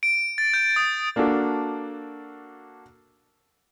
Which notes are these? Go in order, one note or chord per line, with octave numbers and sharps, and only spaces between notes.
D7
A6
G6
D#6
A#3 D4 F#4 A4